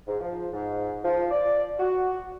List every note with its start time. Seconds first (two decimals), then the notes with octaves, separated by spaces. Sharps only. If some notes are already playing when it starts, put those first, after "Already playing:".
0.07 G#2
0.20 F3
0.53 G#2
1.04 F3
1.31 D5
1.79 F#4